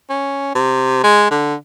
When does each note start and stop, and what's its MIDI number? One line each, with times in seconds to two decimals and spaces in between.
0.10 0.50 61
0.55 1.01 48
1.04 1.28 56
1.31 1.55 50